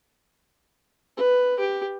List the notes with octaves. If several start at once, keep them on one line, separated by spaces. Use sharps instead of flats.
B4
G4